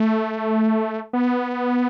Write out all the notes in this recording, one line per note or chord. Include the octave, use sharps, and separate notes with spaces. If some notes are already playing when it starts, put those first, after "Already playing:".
Already playing: A3
B3